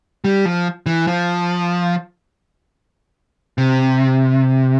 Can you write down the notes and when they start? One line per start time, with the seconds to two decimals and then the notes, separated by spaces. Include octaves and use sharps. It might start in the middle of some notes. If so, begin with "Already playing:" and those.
0.24 G3
0.45 F3
0.86 E3
1.07 F3
3.58 C3